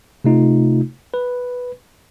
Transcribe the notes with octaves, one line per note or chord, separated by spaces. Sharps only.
C3 A3 D#4 F4
B4